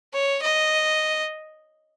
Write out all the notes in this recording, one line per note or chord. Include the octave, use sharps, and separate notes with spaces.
C#5
D#5